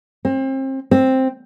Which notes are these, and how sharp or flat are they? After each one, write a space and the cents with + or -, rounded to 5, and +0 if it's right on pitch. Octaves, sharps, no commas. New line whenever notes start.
C4 +35
C4 +5